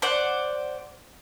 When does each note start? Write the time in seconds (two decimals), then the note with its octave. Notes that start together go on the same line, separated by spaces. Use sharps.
0.02 C5 D5 F#5